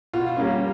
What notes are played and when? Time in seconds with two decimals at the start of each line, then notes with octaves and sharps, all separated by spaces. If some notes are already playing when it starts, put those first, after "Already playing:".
0.13 B2 F4
0.37 G3 A#3 C#4